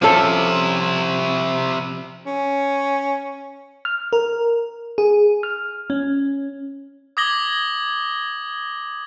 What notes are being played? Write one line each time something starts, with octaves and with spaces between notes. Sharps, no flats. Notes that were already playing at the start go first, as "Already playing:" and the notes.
C3 F3 C#4 E4 A4
C#4
F6
A#4
G#4
F6
C#4
D6 D#6 G#6 A#6 F#7 G7